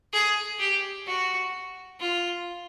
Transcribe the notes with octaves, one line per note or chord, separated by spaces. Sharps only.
G#4
G4
F#4
F4